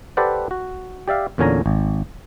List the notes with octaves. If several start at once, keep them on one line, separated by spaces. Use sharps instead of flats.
G4 A4 B4 C5 D5 F#5
F#4
G4 D5 E5 F5
E2 A#2 D3 C#4 G#5 A#5
G#1